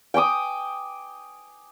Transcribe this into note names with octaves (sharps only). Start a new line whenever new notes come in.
G5 G#5 D6 D#6